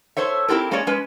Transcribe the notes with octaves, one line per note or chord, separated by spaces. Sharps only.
A4 C5 C#5 E5
C4 E4 G4 A4 A#4
G#3 A#3 C#4 G#4 C#5 D5
G#3 C#4 B4